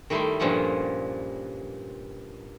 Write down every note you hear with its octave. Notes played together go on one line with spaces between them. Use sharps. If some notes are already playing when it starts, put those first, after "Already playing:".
D#3 G3 A3 E4 G5 C6
G2 A#2 F3 G3 C#4 F#5